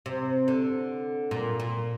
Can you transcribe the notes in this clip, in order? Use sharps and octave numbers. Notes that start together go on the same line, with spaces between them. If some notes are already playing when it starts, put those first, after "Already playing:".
C3
D3
A#2
A#2